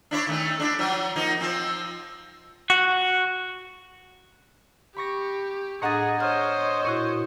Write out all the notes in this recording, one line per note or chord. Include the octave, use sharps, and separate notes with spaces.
D4 E4 C#5
D#3 A3 C#4
D4 E4
F3 F#3
F3 A#3 D#4
F3 C4
F#4
G4 B5 C#6 A#6
A2 D4 G#4 D#5 F#5 A#5 A6 C#7
C5 C#5 D#5 F6
A#2 E4 F#4 C#6